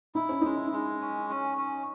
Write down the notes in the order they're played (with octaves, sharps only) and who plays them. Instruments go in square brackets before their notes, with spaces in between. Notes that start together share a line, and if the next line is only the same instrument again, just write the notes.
[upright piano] D#4 [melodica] E4
[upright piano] C#4
[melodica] G#3 [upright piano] D#4
[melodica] G#3
C#4
C#4
C#4